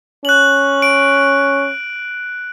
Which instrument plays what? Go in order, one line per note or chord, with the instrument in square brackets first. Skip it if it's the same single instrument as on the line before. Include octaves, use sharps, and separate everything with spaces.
[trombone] C#4 [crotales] F#6 F#7
[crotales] D7